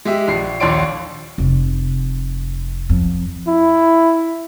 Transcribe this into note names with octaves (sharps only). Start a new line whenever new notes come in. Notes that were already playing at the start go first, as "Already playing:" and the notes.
G#3 G4 E5
A#1 C7
A#1 D#2 C#5 D5 C6 D7
F1
F2
E4